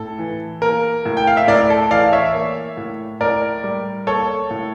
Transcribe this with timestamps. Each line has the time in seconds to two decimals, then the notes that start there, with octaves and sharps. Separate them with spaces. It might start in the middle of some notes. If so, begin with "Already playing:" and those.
Already playing: A2 A4
0.19 E3
0.62 A#3 A#4
1.05 A2
1.17 G5
1.27 F5
1.37 E5
1.48 A2 A#4 D5
1.70 A4
1.91 E3 D5 F5
2.13 C#5 E5
2.34 A#3
2.77 A2
3.21 A2 A#4 D5
3.64 G3
4.07 A#3 A4 C#5
4.51 A2